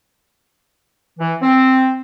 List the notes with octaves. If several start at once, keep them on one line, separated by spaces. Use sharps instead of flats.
E3
C4